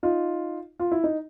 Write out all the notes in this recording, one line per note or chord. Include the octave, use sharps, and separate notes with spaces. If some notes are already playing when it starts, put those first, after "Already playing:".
D#4 F4
F4
E4
D#4